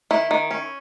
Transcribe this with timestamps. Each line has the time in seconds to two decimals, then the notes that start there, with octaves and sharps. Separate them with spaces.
0.11 D#3 E4
0.31 D#3
0.51 C#4